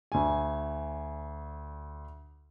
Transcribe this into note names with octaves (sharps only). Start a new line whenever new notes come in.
D2 G#5